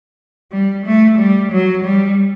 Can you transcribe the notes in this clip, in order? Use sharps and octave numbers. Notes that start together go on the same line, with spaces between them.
G3
A3
G3
F#3
G3